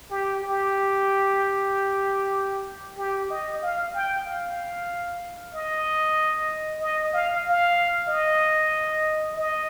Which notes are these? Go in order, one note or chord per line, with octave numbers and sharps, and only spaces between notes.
G4
G4
G4
D#5
F5
G5
F5
D#5
D#5
F5
F5
D#5
D#5